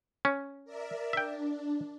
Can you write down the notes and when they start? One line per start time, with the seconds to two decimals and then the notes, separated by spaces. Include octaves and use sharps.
0.25 C#4
0.65 A#4 D5 E5
1.13 D4 E5 G5